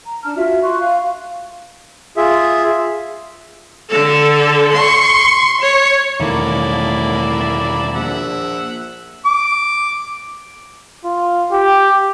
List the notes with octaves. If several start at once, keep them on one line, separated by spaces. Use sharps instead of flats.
A#5
D4 A5 F6
F4 F#4 E5
C6 C#6 F#6
F5
F4 G#4 E5
D3 A4
C6 C#6
C#5
E1 A2 D#3 A#3 E4 D5
A#1 E5 F#5
D6
F4
G4